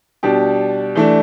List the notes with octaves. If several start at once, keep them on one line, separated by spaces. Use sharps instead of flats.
B2 G3 D4 G4
E3 A3 D4